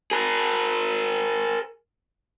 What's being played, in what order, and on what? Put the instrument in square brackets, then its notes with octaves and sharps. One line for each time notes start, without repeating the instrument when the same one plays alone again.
[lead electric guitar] G#4 A#4